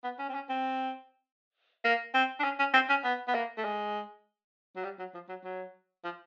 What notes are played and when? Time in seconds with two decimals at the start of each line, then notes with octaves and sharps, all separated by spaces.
0.04 B3
0.19 C#4
0.29 C4
0.34 C#4
0.49 C4
1.84 A#3
2.14 C4
2.40 D4
2.44 C#4
2.59 C#4
2.74 C4
2.89 C#4
3.04 B3
3.28 B3
3.34 A#3
3.57 A3
3.64 G#3
4.76 F#3
4.84 G3
4.99 F#3
5.14 F3
5.29 F#3
5.44 F#3
6.04 F3